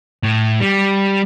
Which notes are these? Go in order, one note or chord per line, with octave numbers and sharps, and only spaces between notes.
A2
G3